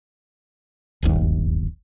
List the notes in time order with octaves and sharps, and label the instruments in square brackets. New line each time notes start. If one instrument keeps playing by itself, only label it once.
[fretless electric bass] D1 G1 D#2